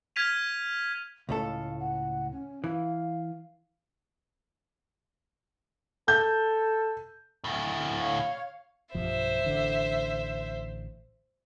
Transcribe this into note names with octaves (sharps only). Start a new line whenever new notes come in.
F6 G#6 B6 D#7 F7
C#2 A2 A4 F5
F#5
C#4
E3 F5
A4 G6
D2 A2
C#5 F5
B1 G2 F3 C5 E5
A1 D3